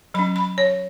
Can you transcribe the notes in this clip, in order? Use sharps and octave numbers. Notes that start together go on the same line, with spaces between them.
F#3 C#4 B5
B5
C#5